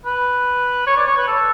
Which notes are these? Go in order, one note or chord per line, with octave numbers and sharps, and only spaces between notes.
B4
C#5
D5
C#5
B4
A4